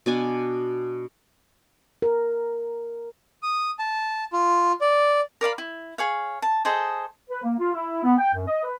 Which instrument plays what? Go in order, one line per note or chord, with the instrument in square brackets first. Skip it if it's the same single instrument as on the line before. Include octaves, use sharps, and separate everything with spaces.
[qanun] B2 D4 G#5
[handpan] A#4
[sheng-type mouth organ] D#6
A5
F4
D5
[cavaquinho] A#4 D5 F5 B5
E4
G#4 C#5 F5
A5
G#4 A4 C5 D#5
[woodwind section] B4
A#3
F4
E4
B3
G5
F#2
D#5
B4